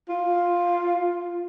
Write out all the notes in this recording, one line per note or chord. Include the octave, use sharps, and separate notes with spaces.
F4